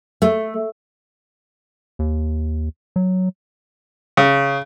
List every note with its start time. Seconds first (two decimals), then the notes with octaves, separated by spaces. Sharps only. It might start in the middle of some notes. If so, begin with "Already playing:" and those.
0.22 A3
1.99 D#2
2.96 F#3
4.17 C#3